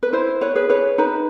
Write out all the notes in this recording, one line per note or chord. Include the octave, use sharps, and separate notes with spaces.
B4
E4 C5
B4 C#5
G#4 B4
B4 C#5
D#4 B4